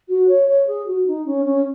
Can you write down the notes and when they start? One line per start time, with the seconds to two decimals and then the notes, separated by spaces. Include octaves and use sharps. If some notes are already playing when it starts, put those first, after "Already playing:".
0.08 F#4
0.27 C#5
0.48 C#5
0.67 G#4
0.86 F#4
1.06 D#4
1.25 C#4
1.45 C#4